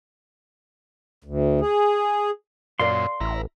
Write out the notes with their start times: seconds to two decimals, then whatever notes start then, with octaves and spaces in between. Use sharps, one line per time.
1.24 D2
1.61 G#4
2.80 F#2 A#2 A#4 D5 F5 C6
3.20 A1 E4 A#5